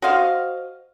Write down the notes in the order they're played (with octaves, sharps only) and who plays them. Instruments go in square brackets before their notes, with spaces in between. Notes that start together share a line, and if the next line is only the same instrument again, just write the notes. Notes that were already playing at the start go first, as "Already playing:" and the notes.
[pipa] F#4 C5 D#5 F5